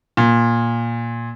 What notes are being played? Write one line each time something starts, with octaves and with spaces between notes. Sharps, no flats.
A#2